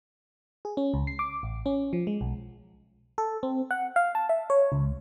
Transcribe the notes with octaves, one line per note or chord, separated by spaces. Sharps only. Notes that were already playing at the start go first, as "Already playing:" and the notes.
G#4
C#4
C#2
C7
D6
A1
C#4
F3
G#3
B1
A4
C4
F#5
F5
A5
E5
C#5
C#2